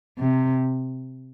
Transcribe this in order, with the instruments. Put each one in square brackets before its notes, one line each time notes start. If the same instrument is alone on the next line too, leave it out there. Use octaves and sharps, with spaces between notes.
[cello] C3